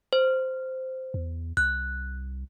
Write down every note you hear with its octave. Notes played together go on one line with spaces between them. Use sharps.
C5
E2
C2 F#6